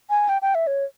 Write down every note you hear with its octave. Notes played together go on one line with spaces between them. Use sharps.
G#5
G5
G5
E5
C#5